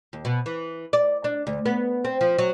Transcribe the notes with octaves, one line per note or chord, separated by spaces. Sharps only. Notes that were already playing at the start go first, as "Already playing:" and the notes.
D#2
B2
E3
D5
D4
D2
B3
C4
F3
F#3